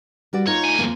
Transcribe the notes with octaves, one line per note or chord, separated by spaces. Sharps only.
G3 F#4 D5
D#4 F4 C#5 D#5
D2 G#5
F2 F3 A#3